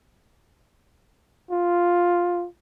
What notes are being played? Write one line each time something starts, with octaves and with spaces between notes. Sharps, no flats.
F4